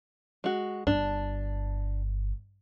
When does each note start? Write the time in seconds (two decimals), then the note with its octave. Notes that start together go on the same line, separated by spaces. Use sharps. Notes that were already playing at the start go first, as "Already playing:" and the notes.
0.44 G#3 F#4
0.87 G1 D4